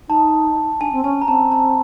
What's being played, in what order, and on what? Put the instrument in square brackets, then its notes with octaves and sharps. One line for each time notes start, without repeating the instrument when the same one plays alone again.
[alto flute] D#4 [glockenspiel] A5
[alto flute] D4 [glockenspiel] G#5
[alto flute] C4
[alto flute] C#4 [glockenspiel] G#5
[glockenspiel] A#5
[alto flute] C4 [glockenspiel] A5
[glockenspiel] A5